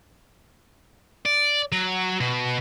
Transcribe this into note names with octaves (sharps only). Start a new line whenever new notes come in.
D5
F#3
B2